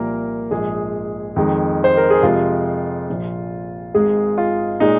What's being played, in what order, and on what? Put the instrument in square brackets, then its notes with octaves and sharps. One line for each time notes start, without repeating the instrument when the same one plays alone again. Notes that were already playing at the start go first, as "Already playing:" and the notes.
Already playing: [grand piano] C2 A#2 F3 A#3 A#4
A#1 G#2 F3 G#3 G#4
F2 D#3 G#3
C5
A#4
G#4
F2 C3 G#3 F4
A#1 A#2 F3
G#1 G#2 G#3 G#4
F4
A#2 G#3 D#4